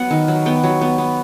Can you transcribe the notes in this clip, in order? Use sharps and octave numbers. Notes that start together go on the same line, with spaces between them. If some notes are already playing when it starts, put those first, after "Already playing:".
Already playing: F#3 B3 F#5
D#3
F#3
B3 G5
F#3
B3
B3